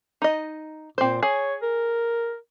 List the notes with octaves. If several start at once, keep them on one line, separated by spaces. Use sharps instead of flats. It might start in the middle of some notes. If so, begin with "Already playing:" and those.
D#4 D#5
A#2 C4 C5
G#4 C#5
A#4